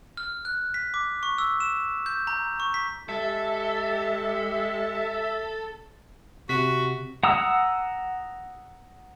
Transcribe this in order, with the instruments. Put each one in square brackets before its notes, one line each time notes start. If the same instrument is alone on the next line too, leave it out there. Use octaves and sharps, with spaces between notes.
[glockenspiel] F6
F#6
B6
D6
C#6
E6
E7
G6
A#5
C#6
B6
[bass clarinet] G#3 [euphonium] G4 [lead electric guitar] A4 [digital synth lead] E5
[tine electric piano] C3 B6 [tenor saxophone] F#4
[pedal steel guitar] F#5 A#5 D#6 E6